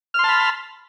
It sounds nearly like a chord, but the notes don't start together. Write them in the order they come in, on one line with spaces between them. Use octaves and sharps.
F6 C6 A5 B5